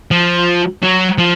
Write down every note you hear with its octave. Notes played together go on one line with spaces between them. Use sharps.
F3
F#3
F3